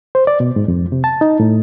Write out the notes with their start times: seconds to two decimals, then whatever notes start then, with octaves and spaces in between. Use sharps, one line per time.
0.15 C5
0.27 D5
0.40 B2
0.56 G#2
0.68 F2
0.92 C3
1.04 A5
1.21 D#4
1.40 A2